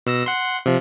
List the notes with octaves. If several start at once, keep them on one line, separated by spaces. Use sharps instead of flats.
B2 E6 A#6
F#5 C6
C3 F3